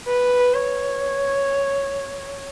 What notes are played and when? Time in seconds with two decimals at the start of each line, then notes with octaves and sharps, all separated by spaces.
0.08 B4
0.54 C#5